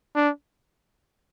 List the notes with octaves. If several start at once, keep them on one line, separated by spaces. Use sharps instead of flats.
D4